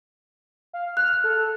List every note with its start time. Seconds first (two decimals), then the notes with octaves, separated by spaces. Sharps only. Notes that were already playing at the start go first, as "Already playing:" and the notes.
0.73 F5
0.97 F6 F#6
1.24 A4